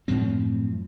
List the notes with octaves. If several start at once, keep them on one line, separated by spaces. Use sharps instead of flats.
F#2 A2 F3 C4